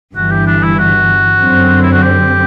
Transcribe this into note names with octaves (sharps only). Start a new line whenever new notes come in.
G1 G2 E3 F#4
G4
D4
E4
F#4
F#2 D3 F#3 C4
E4
F#4
G4